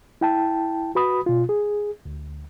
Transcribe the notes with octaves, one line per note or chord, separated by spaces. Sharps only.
E4 G5 A5
F#4 B4 B5 D#6
B2 F4
G#4
D2